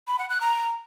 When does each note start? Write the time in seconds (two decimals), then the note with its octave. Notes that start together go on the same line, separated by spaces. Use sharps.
0.07 B5
0.18 F#5
0.30 F#6
0.41 A#5